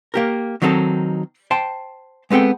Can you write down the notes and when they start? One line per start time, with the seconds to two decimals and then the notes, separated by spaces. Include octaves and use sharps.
0.14 A#3 G4 A#4
0.62 D#3 F#3 C4 D#4 A4
1.51 C5 G5 A5 C6
2.30 G#3 B3 C4 A4 G5